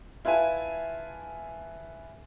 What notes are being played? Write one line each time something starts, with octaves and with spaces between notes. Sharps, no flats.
E4 F4 B4 E5 G#5 A5